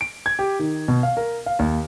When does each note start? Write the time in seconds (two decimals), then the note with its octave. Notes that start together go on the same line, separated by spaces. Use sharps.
0.01 D7
0.26 G#6
0.39 G4
0.59 D#3
0.88 B2
1.03 F5
1.17 A#4
1.46 F5
1.59 D#2